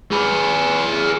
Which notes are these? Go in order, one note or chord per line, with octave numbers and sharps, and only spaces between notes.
G#4 B4